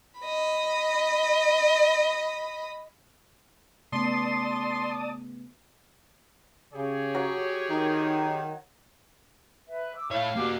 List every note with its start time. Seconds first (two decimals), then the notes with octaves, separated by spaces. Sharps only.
0.20 D#5 B5
3.92 C#3 A3 B3 D5 A5 C6 D#6
6.74 C#3 G4 G#4 C#5
7.15 F#3
7.69 D#3 D#4
9.67 B4 E5
9.95 D6 E6
10.11 A3 E4 C#5 F5
10.36 A#3 F#4 G4 D6